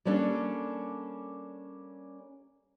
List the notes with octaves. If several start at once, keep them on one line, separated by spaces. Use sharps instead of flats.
G3 A#3 C#4 D4 A4